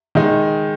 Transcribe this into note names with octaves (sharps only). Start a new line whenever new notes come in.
D#3 G#3 D#4